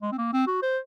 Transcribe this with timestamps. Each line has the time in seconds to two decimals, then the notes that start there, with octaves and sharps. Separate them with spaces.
0.02 G#3
0.12 C4
0.18 A#3
0.33 C4
0.47 F#4
0.62 C5